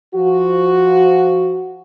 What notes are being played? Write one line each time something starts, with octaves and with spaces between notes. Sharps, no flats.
F3 F#4